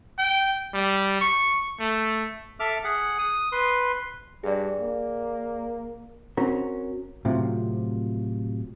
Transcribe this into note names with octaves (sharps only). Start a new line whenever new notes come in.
G5
G3
C#6
A3
A4 E5 D6 F6
G#4 F#5
D#6
B4 C6
G2 G#4 D5
A#3
C4 C#4 F#4 A#4
A2 C3 F3 F#3